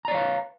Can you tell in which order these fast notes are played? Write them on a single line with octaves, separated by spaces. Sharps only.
A#5 D5 C#5 F5 B4